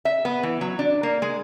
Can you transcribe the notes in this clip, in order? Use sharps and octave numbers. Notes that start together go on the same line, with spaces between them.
E5
B3
E3
F#3
D4
A#3
G#3